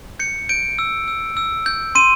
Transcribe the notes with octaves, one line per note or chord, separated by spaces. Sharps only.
G6 C#7
G6 D7
E6
E6
E6
G6
C6 D#7